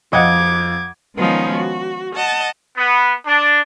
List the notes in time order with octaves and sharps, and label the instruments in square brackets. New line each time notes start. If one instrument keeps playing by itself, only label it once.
[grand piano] F2 F5 D#6 [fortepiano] D#5 F#5 [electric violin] D6 G#6
[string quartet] D#3 F3 G#3 B3 C#4 D#4
F#4
D#5 F#5 A5
[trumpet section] B3
D4